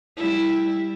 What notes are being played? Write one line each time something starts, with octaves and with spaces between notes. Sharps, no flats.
G3 E4